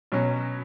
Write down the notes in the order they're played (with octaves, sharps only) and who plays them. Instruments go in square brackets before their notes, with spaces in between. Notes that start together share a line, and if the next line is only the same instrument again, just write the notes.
[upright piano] B2 F#3 C#4